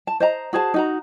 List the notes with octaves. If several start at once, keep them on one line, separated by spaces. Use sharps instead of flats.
A5
C5 D#5 A#5
F#4 G#4 C5 A5
D#4 F#4 A#5